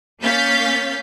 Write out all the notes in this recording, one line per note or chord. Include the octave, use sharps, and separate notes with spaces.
A#3 C#4 F5 G6 A6 B6